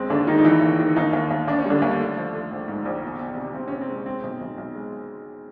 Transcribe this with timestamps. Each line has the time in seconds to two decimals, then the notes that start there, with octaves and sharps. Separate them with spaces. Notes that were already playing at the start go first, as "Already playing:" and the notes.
Already playing: F#2 G#3 C4
0.10 D#2 D3 D4
0.27 D#3 G#3 D#4
0.38 D#4
0.45 D#3 E3 E4
0.62 D#2
0.79 D#3
0.96 D#2 D#3 D#4
1.13 D#2
1.31 D#2
1.47 D#2 D4
1.59 C#4
1.66 D3 G3 D4
1.82 D#2
2.00 A3
2.17 F3
2.34 A3
2.51 A#1
2.68 G#2
2.85 A#1
3.03 E2
3.20 E2
3.37 C3
3.54 C3 C4
3.68 C3 C#4
3.81 C4
3.88 G#3
4.06 G#3 C4
4.23 B1
4.41 B1
4.58 B1
4.75 G#3